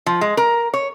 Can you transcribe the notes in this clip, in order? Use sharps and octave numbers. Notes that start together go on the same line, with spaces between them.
F3
G#3
A#4
C#5